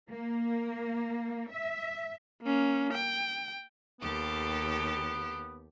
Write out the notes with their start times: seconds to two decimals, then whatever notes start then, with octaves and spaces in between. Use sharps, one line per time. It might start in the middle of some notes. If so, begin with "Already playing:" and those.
0.10 A#3
1.52 E5
2.42 A#3 C#4
2.93 G5
4.01 D#2 B3 G4 A4